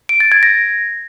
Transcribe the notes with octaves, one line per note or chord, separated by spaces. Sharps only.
D7
A6
G#6
A#6